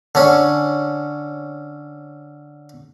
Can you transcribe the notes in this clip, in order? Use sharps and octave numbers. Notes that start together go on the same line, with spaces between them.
D3 C#4